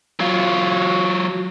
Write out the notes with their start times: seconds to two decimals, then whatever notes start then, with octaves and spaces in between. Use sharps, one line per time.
0.20 F#3 F4